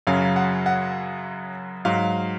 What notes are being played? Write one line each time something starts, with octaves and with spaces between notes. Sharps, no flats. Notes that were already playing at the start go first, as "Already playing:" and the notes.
F#2 C#3 F#3 F5
F#5
F#5
G#2 F#3 F5